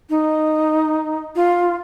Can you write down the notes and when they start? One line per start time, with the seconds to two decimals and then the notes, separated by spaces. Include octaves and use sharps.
0.10 D#4
1.36 F4